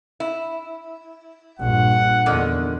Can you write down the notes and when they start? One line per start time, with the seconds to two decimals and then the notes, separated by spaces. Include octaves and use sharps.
0.20 E4
1.59 A#1 G2 F#5
2.26 E2 D3 D#3 F3